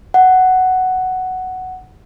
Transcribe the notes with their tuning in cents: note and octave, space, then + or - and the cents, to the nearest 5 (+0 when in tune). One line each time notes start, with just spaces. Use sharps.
F#5 +5